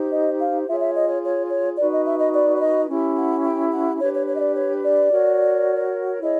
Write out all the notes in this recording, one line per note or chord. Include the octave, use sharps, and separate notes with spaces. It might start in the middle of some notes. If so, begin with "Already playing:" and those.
Already playing: D#4 G4 C5
D#5
F5
F4 G#4 C#5 E5
E5
D#5
C#5
C#5
C#5
D#4 F#4 B4 D5
D#5
E5
D#5
D5
D5
D#5
C#4 E4 G4
F#5
G5
F#5
D4 G4 B4 C#5
C#5
C#5
D#5
D5
C#5
D5
F#4 A#4 C#5
E4 G#4 C#5 D#5